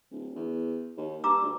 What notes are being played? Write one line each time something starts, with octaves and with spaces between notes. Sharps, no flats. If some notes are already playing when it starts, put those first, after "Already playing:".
D1
E2
D#2
G2 A#5 D6 E6
D2